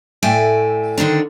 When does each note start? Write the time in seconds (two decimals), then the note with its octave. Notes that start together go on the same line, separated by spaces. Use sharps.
0.23 A2 A3 D5 E5 G5 G#5
0.98 D3 D#3 C4 D4